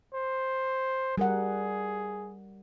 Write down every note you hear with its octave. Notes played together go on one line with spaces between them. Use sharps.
C5
G3 G#4 A#4 F#5